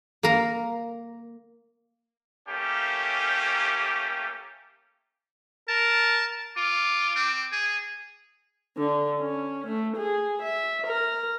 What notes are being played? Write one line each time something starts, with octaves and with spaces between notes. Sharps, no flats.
A#3 A#4
A3 A#3 C#4 G4
A#4 A5
F4 D6
C4
G#4
D3
C#4
A3
G#4
E5
A#4